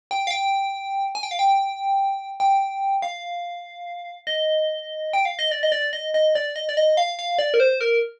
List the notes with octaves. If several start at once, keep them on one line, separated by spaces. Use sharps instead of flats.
G5
F5
G5
G#5
G5
F5
G5
G5
F5
D#5
G5
F5
D#5
D5
D#5
D5
D#5
D#5
D5
D#5
D5
D#5
F5
F5
D5
A#4
C5
A#4